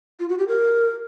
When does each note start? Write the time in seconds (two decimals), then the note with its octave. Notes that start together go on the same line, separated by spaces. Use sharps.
0.20 F4
0.29 F#4
0.38 G4
0.48 A#4